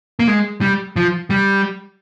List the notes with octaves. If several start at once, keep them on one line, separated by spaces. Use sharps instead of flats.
A#3
G#3
G3
F3
G3